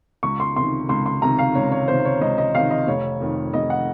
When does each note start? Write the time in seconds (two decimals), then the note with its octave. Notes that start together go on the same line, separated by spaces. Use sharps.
0.23 C#2 C#6
0.40 C6
0.56 C3 D#3 C6
0.89 C#2 C6
1.06 C6
1.22 C3 D#3 A#5
1.39 F5
1.55 C#2 C#5
1.72 C#5
1.88 C3 D#3 C5
2.05 C#5
2.21 C#2 D#5
2.38 D#5
2.54 C3 D#3 F5
2.71 D#5
2.87 F1 C#5
3.20 F2 D#3
3.54 F1 D#5
3.70 F#5